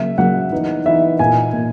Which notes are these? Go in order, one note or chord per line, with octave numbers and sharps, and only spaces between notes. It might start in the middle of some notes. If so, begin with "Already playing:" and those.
Already playing: C#3 F#3 A#3 E5
C#3 F#3 A#3 F#5
E3 B3 D#4
E3 B3 D#4 E5
A#2 A#3 D#4 G#5
A#2 A#3 D#4